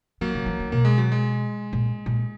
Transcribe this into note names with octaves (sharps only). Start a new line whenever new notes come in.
D#3 F#3 A#3
C#3
E3
D#3
B2 A#3
G#3
F#3
G#3
A#2
A#2